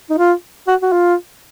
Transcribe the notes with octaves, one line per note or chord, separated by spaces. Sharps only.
D#4
F4
F#4
F#4
F4